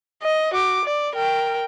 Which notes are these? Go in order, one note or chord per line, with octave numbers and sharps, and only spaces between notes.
D#5
F#4 D6
D5
A#4 G5